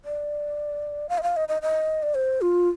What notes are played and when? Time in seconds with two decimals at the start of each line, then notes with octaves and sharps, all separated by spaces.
0.05 D5
1.09 F5
1.18 D#5
1.23 F5
1.37 D#5
1.48 D#5
1.62 D#5
2.03 D5
2.15 C5
2.41 F4